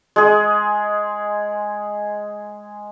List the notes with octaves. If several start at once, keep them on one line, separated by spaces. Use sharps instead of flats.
G#3 G#4